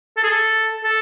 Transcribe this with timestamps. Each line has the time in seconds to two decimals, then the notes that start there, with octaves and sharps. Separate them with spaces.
0.17 A4
0.23 G#4
0.31 A4
0.84 A4